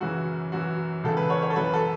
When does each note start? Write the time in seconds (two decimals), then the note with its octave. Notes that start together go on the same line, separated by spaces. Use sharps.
0.01 F#2 C#3 E3 F#4
0.52 F#2 E3 F#4
1.04 C#2 C#3 E3 A4
1.17 B4
1.30 C#5
1.43 C#5
1.50 A4
1.56 F#2 E3 B4
1.74 A4